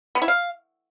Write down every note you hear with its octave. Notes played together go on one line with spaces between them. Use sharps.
B3
E4
F5